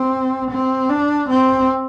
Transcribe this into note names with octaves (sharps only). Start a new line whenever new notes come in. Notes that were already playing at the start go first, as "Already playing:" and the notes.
Already playing: C4
C4
D4
C4